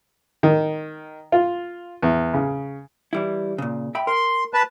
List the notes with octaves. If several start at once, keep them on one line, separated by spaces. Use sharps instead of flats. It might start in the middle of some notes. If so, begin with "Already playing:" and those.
D#3
F4
E2
C#3
E3 G3 E4
A#2 C#3
E5 G5 B5
A#4 C6
B4 A5